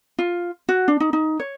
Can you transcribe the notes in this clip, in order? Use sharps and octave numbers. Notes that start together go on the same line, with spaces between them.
F4
F#4
D4
D#4
D#4
C#5